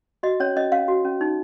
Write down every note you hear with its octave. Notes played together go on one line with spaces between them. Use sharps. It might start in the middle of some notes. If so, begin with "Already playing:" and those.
F#4 D#5
C#4 C#5
C#4 D#5
C#4 F5
F#4
C#4
D#4